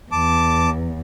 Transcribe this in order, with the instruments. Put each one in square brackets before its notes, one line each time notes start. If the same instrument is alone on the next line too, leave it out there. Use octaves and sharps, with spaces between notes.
[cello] E2 [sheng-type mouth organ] A5 D6